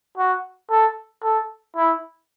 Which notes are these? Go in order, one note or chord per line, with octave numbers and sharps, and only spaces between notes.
F#4
A4
A4
E4